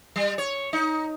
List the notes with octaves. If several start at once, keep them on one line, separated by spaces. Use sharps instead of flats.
G3
C#5
D#4